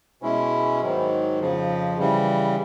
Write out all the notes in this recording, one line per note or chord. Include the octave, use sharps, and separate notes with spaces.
B2 G#3 C#4 E4
G#2 D#3 F#3
F2 C#3 F3
C#3 E3 G3